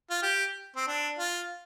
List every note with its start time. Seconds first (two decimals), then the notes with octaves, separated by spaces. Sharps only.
0.10 F4
0.23 G4
0.76 C4
0.87 D4
1.19 F4